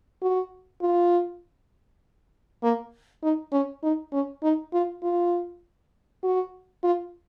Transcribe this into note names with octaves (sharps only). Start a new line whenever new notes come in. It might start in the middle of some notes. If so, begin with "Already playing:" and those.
F#4
F4
A#3
D#4
C#4
D#4
C#4
D#4
F4
F4
F#4
F4